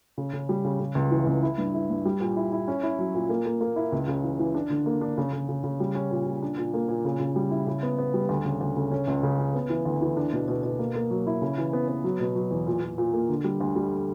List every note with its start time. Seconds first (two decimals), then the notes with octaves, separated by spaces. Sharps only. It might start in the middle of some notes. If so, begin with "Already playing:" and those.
0.18 C#3
0.33 C#3
0.49 G3
0.65 C#3
0.80 C#3
0.95 C#2
1.11 E3
1.27 C#2
1.43 E4
1.58 G2
1.74 E4
1.90 G2
2.05 G3
2.20 A#2
2.36 E4
2.52 E4
2.68 C#4
2.83 E4
2.99 F#3
3.14 A#2
3.29 A#3
3.45 A#3
3.61 A#3
3.76 E4
3.92 C#2
4.08 C#3
4.24 E3
4.39 E3
4.55 D4
4.70 D3
4.86 A#3
5.01 D4
5.18 C#3
5.33 C#3
5.49 C#3
5.64 C#3
5.80 G3
5.95 C#4
6.11 A#2
6.26 A#2
6.42 D4
6.58 A#2
6.74 A#3
6.89 A#2
7.05 C#3
7.20 C#3
7.36 G3
7.51 E4
7.67 C#3
7.83 B3
7.98 B3
8.14 G3
8.29 D2
8.45 C#3
8.61 D2
8.77 C#3
8.91 C#4
9.08 C#2
9.23 C#3
9.39 C#4
9.55 B3
9.70 E3
9.85 D2
10.02 E3
10.17 D4
10.33 B2
10.48 B2
10.63 B2
10.79 A#3
10.95 A#3
11.10 F#3
11.27 E4
11.42 C#3
11.58 E3
11.73 B3
11.88 B3
12.04 F#3
12.20 B2
12.36 F#3
12.51 E2
12.67 A#2
12.82 A#2
12.98 A#2
13.13 A#3
13.29 D3
13.44 G3
13.61 D2
13.76 G3